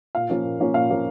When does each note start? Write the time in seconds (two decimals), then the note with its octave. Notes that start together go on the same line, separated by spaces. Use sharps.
0.15 A#2 F5
0.30 F3 A#3 C#4
0.45 A#2
0.60 F3 A#3 C#4
0.74 A#2 F5
0.89 F3 A#3 C#4